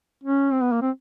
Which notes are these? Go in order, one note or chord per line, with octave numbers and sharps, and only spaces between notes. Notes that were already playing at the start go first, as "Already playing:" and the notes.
C#4
C4
B3
A#3
C4